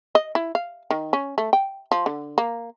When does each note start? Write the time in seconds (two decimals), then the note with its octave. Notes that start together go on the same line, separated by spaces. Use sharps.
0.15 D#5
0.35 E4
0.55 F5
0.90 D#3
1.13 C#4
1.38 A3
1.53 G5
1.92 F3
2.06 D3
2.38 A#3